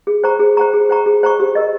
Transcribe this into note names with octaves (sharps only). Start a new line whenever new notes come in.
G#4
C5 G5 A#5 C#6
G#4
C5 G5 A#5 C#6
G#4
C5 G5 A#5 C#6
G#4
C5 G5 A#5 C#6
G4
A#4 D#5